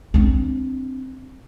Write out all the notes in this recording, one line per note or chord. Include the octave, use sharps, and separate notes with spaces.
C4 D4